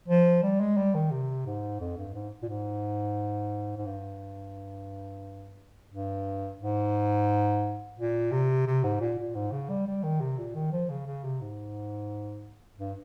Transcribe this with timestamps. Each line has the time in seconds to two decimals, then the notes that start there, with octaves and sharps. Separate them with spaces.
0.08 F3
0.43 G3
0.60 G#3
0.77 G3
0.94 D#3
1.11 C3
1.46 G#2
1.80 F2
1.97 G2
2.14 G#2
2.42 A#2
2.49 G#2
3.77 G#2
3.86 G2
5.92 G2
6.60 G#2
7.98 A#2
8.32 C3
8.66 C3
8.84 G#2
9.01 A#2
9.18 A#2
9.35 G#2
9.52 C#3
9.70 G3
9.87 G3
10.03 D#3
10.20 C3
10.38 A#2
10.55 D#3
10.72 F3
10.90 C#3
11.06 C#3
11.24 C3
11.41 G#2
12.78 G2